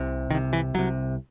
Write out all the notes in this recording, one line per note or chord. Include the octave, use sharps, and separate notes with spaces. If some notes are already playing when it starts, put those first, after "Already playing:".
Already playing: C2 C3
C2 C3 D#3
E3
C2 C3 F#3